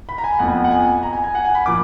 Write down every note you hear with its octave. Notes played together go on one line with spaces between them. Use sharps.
B5
A#5
G#5
F2 F3 B3 F#5
F#5
G#5
A#5
G#5
G#5
F#5
G#5
B5
A#2 F3 D6